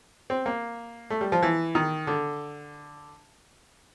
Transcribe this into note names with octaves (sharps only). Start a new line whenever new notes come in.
C4
A#3
A3
G3
F3
E3
D#3
D3